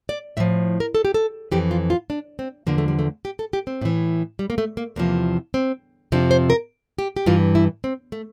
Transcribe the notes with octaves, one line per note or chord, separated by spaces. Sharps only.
D5
A2 F3 E5
A#4
A4
G4
A4
F2 E3 G4
F4
F4
D4
C4
E2 D3 F3 A#3
A3
G3
A3
G4
A4
G4
C4
A2 E3
G3
A#3
A3
A#3
E2 C3 F3 A#3
C4
F2 C3 F3 D4
C5
A#4
G4
G4
G2 E3 F4
E4
C4
A3